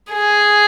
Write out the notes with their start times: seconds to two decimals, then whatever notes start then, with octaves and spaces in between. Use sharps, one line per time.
0.13 G#4